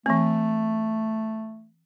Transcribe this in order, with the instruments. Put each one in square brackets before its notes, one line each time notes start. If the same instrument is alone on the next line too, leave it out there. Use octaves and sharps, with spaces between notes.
[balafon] E3 C4 [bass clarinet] A3